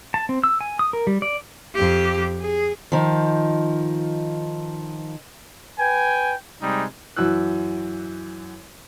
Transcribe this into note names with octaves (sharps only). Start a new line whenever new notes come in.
A5
C4
E6
G#5
D#6
A#4
G3
D5
F2 G4
G#4
D#3 F3
B4 G5 G#5
C3 G3 G#3 D#4
F#2 E3 E6 F#6